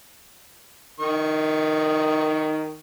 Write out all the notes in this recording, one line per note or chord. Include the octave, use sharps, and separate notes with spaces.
D#3 C#6